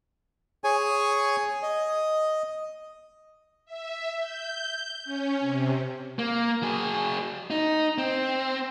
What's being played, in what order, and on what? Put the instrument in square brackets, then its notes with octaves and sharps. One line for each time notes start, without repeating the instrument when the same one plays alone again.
[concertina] G#4 C#5 G#5
D#5
[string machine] E5
G6
C#4
C3
[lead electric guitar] A#3
F#3 G#4
D#4
C4